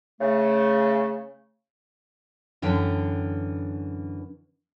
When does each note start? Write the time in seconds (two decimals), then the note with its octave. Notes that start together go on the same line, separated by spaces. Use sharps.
0.21 C#3 A3
2.62 F#2 D3 E3 G5